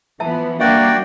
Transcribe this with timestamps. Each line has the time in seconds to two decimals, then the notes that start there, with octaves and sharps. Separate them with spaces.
0.20 E3 F3 B3 E5 A5
0.60 G3 A#3 D4 F#4 D5 E5 G5